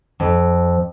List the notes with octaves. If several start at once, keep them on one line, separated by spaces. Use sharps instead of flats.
F2